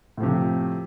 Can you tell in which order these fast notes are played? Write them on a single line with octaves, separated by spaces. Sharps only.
A2 F3 C3